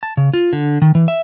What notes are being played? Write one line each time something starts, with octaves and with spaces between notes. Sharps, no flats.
A5
C#3
F4
D3
D#3
E3
E5